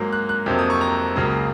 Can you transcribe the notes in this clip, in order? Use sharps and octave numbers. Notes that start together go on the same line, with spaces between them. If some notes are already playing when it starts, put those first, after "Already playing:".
Already playing: G#2 F#3 A#3
F#6
F#6
F2 C3 F#3 A#3
D#6
C#6
A#5
C#2 C#3 F#3 A#3